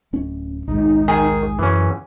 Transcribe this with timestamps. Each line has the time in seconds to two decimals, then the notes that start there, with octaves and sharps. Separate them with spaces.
0.13 D1 C#4
0.67 A#1 D#2 G#2 D#4
1.08 D#3 G#4
1.59 F#2 E3 C#4